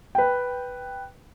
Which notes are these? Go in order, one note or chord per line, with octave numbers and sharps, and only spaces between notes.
B4 G5